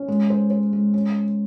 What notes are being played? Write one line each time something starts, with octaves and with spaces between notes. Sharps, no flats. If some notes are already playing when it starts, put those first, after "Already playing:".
Already playing: C#4
G#3
C5
C5
G#3
C#4